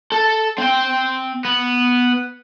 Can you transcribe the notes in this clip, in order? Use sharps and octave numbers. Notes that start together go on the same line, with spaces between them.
A4
C4 G5
B3